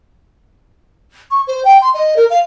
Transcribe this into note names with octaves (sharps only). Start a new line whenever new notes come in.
C#6
C5
G5
C6
D#5
A#4
F5